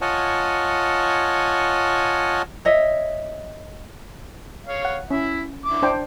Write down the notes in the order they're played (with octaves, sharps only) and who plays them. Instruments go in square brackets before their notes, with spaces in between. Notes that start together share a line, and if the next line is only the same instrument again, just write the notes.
[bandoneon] F4 C#5 D#5 F#5 G#5 A5
[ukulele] C#5 D#5 E5
[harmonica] C#5 F5
[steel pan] F#5
[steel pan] C#4 [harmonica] E4 E5
[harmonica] D3 E4 D6
[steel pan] D4 C5 G5